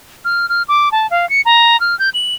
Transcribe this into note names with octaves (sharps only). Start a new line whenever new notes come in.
F6
F6
D6
A5
F5
C#7
A#5
F6
G6
F#7